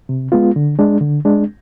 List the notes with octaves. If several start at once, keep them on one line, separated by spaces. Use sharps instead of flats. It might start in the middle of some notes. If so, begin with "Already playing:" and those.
C3
G#3 B3 F4
D3
G#3 D4
D3
G#3 D4